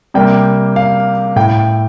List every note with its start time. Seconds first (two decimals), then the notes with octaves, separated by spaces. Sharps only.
0.14 C3 G3 A#3 G5
0.76 F5
1.36 A2 G5